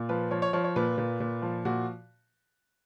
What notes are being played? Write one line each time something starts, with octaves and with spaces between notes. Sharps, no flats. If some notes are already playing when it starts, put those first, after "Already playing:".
Already playing: A#2
F3 B4
F3 C#5
C#5
F3 C#5
C#5
A#2 B4
A#2
A#2
F3
A#2 F#4